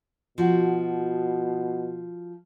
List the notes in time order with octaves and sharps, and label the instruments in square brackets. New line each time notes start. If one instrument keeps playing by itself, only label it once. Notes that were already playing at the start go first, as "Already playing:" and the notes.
[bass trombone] B2 [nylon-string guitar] F3 F#4